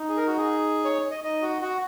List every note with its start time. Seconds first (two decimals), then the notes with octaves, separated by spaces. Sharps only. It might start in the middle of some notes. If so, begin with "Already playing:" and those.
Already playing: D#4
0.08 G#4
0.17 A#4
0.27 F#4
0.37 G#4
0.84 C#5
1.11 D#5
1.23 D#4 D#5
1.42 F#4
1.62 F#4